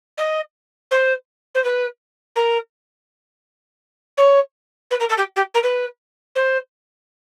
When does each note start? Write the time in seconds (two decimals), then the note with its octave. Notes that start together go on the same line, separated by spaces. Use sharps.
0.17 D#5
0.90 C5
1.54 C5
1.63 B4
2.35 A#4
4.17 C#5
4.90 B4
4.99 A#4
5.08 A4
5.17 G4
5.35 G4
5.54 A#4
5.62 B4
6.35 C5